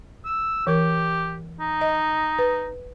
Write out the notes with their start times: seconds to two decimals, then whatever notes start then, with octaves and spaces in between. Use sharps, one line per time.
0.25 E6
0.67 E3 G4 A#4
1.60 D#4
1.81 D#5
2.39 B4